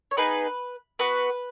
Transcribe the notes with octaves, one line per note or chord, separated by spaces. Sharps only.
C#5
B3 D#4 G#4 B4
B3 F#4 B4